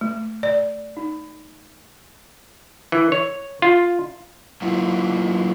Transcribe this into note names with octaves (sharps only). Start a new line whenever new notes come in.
A3
D5
D#4
E3
C#5
F4
F#3 A#3 E4 F4